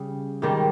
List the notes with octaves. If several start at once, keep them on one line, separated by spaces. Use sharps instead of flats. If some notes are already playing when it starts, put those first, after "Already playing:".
Already playing: C#3 G3
G#2 D#3 G3